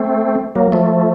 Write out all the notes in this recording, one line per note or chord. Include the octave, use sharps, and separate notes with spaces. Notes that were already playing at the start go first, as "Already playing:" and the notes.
Already playing: A3 C4
F#3 A#3
F3 A3